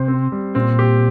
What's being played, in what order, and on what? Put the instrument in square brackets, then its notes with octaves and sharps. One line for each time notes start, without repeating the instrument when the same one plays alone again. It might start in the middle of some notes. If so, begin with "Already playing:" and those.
Already playing: [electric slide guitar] C3 [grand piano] C5
[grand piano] C4
G3
[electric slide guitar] A#2 [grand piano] C4
[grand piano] G4